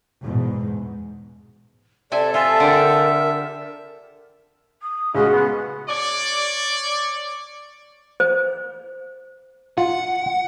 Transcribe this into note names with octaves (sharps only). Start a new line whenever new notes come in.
E2 G#2 B2
C3 A4 D5 E5 G#5 A5
F4 E5 G#5
D3 G4 A#4
D#6
C#2 G#3 C#4 F#4 G#4 D#5
B3
C#5 D5
C5
F4 F#5